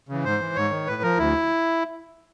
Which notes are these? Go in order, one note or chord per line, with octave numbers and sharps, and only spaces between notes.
C#3 E3
G#2 C5
E3
G#2 C#5
D#3
A2 B4
F3 A#4
D2 E4